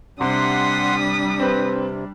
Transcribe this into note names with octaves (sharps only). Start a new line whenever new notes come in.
C3 G3 D4 F#5 C6 D#6 B6
C3 C4 B4